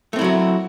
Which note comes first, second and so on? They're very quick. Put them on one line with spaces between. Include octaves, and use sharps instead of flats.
A3 C4 E4 F#3 F#4